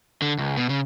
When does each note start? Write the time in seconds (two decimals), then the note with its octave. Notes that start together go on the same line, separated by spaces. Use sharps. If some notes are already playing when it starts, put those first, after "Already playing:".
0.22 D3
0.38 C#2
0.57 B2
0.69 C#3